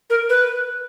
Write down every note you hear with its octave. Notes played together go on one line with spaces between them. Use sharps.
A#4
B4